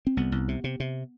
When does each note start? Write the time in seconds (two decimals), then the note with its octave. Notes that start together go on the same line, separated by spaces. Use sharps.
0.07 C4
0.17 C2 B3
0.32 C2
0.48 C3
0.64 C3
0.80 C3